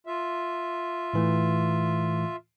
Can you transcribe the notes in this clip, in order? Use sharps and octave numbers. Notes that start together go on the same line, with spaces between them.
F4 E5
A2 E3 A3